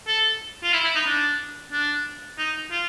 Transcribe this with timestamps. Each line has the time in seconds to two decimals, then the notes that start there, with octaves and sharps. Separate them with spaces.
0.08 A4
0.63 F4
0.73 E4
0.84 E4
0.96 D#4
1.07 D4
1.72 D4
2.38 D#4
2.71 F4